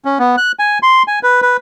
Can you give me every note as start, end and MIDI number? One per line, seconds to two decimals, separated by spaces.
0.05 0.18 61
0.19 0.36 59
0.38 0.52 90
0.59 0.79 80
0.83 1.03 84
1.08 1.19 80
1.23 1.41 71
1.42 1.57 71